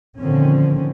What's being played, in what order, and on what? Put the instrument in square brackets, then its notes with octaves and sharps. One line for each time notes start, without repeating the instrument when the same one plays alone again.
[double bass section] A#2 D3 D#3 F3 C4 C#4